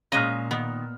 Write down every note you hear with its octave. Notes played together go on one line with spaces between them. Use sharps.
A#2 G#3 C#4 D#5 F5 A#5 F6
D#3 B3